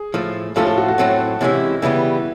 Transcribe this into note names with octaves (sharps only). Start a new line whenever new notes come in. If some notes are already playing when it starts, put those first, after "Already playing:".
Already playing: G#4
A2 F3 A3
A2 F3 A3 C#4 F4 A4
A4
F#4
F#4
A2 F#3 A3 C4
C3 E3 G#3 C#4 E4
C#3 E3 G3 B3 E4